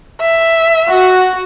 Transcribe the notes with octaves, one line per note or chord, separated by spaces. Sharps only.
E5
F#4